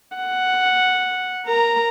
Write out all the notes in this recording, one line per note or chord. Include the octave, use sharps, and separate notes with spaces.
F#5
A#4 A#5